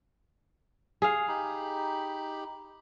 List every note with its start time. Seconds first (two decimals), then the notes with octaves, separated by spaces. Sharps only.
1.02 G#4 F5
1.28 D#4 G4 B5